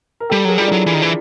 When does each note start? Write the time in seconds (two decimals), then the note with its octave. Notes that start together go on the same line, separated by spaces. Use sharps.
0.20 A#4
0.29 G3 G4 A4
0.45 F#3 G#4 A#4
0.58 G3 F4
0.67 F#3 D4 E4
0.87 E3
0.94 D#3
1.02 E3